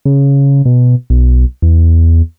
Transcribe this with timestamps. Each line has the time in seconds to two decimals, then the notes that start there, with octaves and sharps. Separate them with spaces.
0.05 C#3
0.65 B2
1.10 B1
1.62 E2